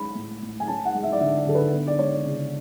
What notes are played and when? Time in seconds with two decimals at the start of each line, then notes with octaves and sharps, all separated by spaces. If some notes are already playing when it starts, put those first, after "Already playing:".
Already playing: G#3 C#4 B5
0.15 A2
0.42 A2
0.60 G#5
0.68 C#4 A5
0.85 F#5
0.95 G#3
1.03 E5
1.12 D5
1.20 D3 E5
1.38 D5
1.46 D3 A4
1.55 B4
1.73 B3
1.87 D5
1.99 G#3 C#5
2.25 C#3